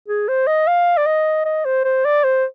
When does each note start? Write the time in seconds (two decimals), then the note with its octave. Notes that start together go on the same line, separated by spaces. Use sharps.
0.08 G#4
0.28 C5
0.47 D#5
0.67 F5
0.97 D5
1.06 D#5
1.45 D#5
1.65 C5
1.84 C5
2.05 D5
2.24 C5